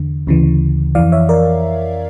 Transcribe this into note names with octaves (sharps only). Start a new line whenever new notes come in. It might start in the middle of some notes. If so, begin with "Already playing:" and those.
Already playing: E2 D3
D2 C#3 E3
F2 E3 D5 F5
C#5 E5
A#4 D5